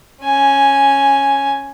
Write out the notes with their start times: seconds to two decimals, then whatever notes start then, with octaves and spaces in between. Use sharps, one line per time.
0.23 C#4 G#5